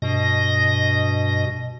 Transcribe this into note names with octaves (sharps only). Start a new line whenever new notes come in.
G2 B2 D#5 A#6